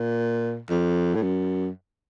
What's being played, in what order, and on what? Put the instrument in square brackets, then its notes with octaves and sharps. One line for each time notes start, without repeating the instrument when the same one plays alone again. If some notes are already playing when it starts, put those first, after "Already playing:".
Already playing: [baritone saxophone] A#2
F2
A2
F#2